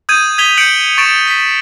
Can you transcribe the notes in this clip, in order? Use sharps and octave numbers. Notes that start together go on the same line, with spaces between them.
D#6 G6 G#6 D#7
D#6 G#6 B6 F7 G7
G6 C#7 D7 F#7
C#6 A6 D7 E7
B6